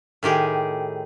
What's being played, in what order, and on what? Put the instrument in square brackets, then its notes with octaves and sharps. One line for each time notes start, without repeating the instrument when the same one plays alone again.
[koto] A2 D#3 G4 G#4